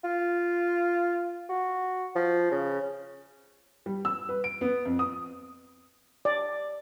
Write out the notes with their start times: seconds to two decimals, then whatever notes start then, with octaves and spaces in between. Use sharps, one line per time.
0.04 F4
1.49 F#4
2.15 F3
2.51 C#3
3.86 G3
4.05 E6
4.29 B4
4.44 D7
4.61 B3
4.85 F2
4.99 D#6
6.25 D5